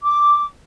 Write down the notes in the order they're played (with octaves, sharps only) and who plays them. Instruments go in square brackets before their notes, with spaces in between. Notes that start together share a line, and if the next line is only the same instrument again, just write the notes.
[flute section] D6